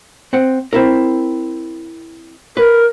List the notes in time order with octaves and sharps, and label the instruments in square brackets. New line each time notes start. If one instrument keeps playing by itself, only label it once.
[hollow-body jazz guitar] C4 F#5
C4 E4 A#4
[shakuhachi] A#4 [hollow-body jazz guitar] B4